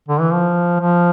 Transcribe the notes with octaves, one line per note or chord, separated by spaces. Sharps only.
D3
E3
F3
F3